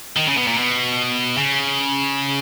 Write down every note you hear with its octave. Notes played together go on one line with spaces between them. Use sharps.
D#3
C#3
B2
A#2
B2
C#3